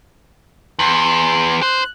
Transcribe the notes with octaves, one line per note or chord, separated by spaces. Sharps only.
E2 C6
C5 F#6